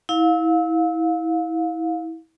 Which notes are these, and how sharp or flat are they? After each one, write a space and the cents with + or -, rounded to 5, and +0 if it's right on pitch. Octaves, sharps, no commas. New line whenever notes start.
E4 -30 F5 +25